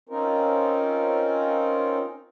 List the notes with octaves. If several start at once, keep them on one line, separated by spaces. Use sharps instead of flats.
C4 C#4 D#4 F4 A#4